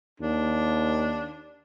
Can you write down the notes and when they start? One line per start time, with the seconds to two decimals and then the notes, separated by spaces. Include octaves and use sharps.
0.20 D#2 D4